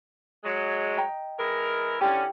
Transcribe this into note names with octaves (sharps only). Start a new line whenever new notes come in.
F#3 G#3
D#5 G5 A#5
E3 G#3 A#4
D3 C#4 E4 G4